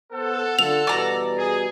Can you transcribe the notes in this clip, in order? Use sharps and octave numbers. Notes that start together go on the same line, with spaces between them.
B3 A4 C5 F#5
D3 F4 F7
B2 E3 G3 D5 A#5
G#4